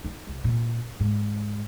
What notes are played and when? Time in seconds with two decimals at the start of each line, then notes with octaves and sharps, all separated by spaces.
0.05 D#4
0.27 C2
0.44 A#2
1.00 G#2